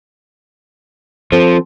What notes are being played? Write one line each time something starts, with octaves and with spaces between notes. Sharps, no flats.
F3 C4 A4 C5